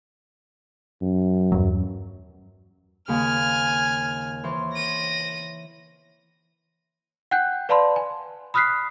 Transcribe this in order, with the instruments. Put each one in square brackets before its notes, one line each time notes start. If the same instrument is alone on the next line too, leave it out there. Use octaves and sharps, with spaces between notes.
[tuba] F#2
[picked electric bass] E2 G2 F#3
[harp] D#2 C#3 [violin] G#5 F6
[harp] E3 C5 C#5
[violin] A#6 D#7
[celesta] F#5 G5 F#6 G6
B4 D5 F5 A5 B5 C6
G#5
B5 D#6 F6 F#6 B6 C7